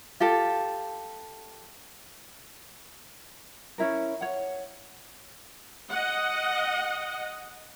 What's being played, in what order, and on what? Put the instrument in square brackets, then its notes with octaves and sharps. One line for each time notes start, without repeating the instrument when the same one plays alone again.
[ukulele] F4 G4 A4
C#4 E4 A#4
C#5 F#5
[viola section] D#5 F#5